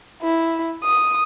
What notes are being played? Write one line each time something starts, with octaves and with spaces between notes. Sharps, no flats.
E4
D#6